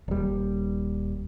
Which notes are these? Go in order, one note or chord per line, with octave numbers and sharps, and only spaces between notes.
D#1 G3